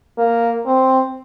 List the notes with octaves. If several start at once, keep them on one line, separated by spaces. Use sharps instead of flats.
A#3
C4